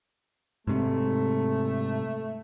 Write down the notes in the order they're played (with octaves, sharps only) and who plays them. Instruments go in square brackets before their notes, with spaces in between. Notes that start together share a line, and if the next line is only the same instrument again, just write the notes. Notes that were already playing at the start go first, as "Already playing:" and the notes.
[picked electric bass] G#2 C3 [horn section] A3